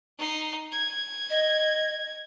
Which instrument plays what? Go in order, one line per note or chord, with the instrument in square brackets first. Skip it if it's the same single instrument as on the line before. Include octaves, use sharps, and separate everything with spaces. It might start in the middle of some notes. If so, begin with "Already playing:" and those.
[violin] D#4 C7
G#6
[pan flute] D#5